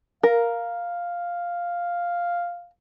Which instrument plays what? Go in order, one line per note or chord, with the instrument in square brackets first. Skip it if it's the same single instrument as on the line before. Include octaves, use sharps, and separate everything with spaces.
[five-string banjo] A#4 [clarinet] F5